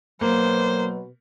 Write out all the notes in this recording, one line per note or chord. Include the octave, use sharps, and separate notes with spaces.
B2 F#3 A#3 C5